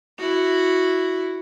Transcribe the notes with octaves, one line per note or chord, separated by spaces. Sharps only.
E4 F#4